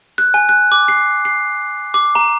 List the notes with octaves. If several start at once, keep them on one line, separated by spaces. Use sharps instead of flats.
F#6
G#5
F#6
D6
C7
C7
D6
A#5